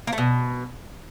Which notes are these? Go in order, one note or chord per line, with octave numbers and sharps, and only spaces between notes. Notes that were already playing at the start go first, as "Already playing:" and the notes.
A#3
A3
B2